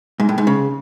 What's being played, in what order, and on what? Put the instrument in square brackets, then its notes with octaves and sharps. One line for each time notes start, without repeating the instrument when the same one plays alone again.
[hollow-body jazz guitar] G#2
A2
G#2
C#3